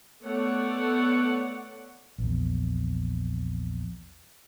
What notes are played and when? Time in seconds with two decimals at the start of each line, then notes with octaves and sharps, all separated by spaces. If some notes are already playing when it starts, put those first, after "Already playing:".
0.24 A3 B3 C#5 D5 F#5
2.18 A#1 E2